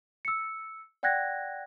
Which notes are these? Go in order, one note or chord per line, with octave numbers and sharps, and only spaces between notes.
E6 C#7
D5 F#5 G5 F#6 G#6 A#6